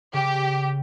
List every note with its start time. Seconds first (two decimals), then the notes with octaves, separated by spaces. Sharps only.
0.13 C#3 G4